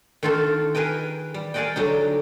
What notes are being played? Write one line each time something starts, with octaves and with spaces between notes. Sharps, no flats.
D#3 C4 F4 F#4 A4
G#4 A#4 B4 D#5 G5
G3
G#4 A#4 D5 D#5 F#5 G5
D3 F#3 G3 D#4